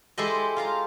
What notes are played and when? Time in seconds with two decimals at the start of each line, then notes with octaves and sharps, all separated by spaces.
0.18 G#3 E4 G4 A4 C5 D#5
0.57 F4 F5 A#5